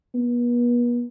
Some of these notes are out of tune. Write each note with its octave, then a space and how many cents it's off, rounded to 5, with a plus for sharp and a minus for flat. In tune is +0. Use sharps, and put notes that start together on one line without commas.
B3 -40